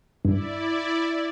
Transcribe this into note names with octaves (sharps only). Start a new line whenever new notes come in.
G2 E4 D5